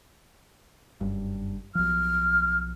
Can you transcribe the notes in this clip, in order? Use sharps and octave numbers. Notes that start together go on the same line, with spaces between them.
F#1 G2
B1 F3 F6